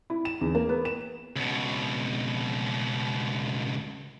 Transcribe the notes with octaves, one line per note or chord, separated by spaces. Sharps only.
E4
E7
E2
A#3
B3
E7
C#2 B2